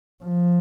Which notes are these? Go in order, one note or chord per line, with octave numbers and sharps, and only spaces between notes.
F3